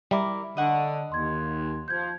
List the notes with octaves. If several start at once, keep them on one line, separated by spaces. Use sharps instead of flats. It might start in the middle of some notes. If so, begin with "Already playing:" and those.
G3 E4 A#4 E5 B5 D6
D3 D#5 F#5 C#6
D#2 C6 G#6
F3 G6 G#6